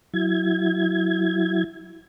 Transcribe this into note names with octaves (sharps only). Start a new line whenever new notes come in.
F#3 E4 G#6